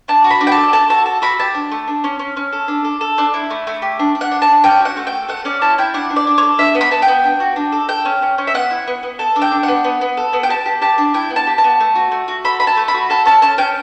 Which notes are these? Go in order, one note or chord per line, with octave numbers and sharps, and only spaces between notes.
D4 A5
F#4
B5
D4
G5
A5
A4
A4 A5
F#4 A5
A4 A5
F#4 B5
G4 A5
D4
A3
D4
C#4
C#4
C#4
A4
D4
A4
A4
D4
E4
A3
A3
G4
D4
D4
F#5
D4
A5
D4
C#4 G5
F#4 F#5
A3
G5
A4
A3 F#5
C#4 D5
E4 A5
E4 G5
D4 F#5
D4
D5
D4
C#5
A4
D4 E5
B3
B5
B3 A5
G5
B3
D4
F#4
D4
A4
A4 G5
C#4
C#4
C#4
E5
B3 F#5
E4
B3
B3
A4 A5
D4
G5
D4
F#5
B3
B3
B3
A4
B3
G5
G4 A5
G4
G4 A5
D4
E4 G5
B3
A5
G4
A5
B3
A3
F#4
A3
F#4
A4 B5
A4 B5
A5
A3
B5
F#4
A4 A5
C#4 A5
C#4 A5
C#4 G5